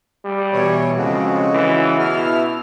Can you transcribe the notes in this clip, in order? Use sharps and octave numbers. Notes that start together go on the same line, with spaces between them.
G3
B2 E3 C#5
F2 C#3 G#3 F#4
E3
B2 E4 F6